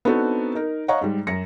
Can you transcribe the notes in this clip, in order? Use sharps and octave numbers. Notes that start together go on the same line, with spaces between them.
B3 C4 D4 D#4 F#4 A4
D#4 A#4
C#5 D#5 F5 F#5 A#5 C#6
G#2 G3
F#2 A#6 C#7